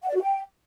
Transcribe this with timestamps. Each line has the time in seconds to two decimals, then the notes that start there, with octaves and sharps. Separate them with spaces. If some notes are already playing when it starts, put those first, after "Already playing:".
0.03 F#5
0.09 D5
0.15 F#4
0.22 G5